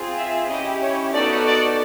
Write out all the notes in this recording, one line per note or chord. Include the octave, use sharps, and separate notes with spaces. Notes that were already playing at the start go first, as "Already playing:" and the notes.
Already playing: C4 F4 G#4
E5
C#4 E4 G4 D#5
C#5
B3 D#4 F#4 A4 D5
D5